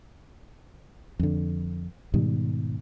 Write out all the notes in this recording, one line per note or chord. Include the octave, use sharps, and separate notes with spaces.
F2 D3
G#2 B2 D#3 G3